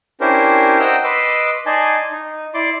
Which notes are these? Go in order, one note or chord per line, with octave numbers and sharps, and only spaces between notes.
C#4 D4 E4 G4 A#4 C5
C5 D#5 F#5 G5 A#5 E6
B4 D#5 C6 D6 E6
D#4 D5 D#5 G#5 A5 C6
D#4
E4 D5 C6 D6